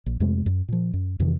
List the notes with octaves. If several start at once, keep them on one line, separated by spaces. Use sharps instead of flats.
A#1
F2 C3 G#3 A3
F#2
A#2 F3
F#2
F2 C3 D#3 E3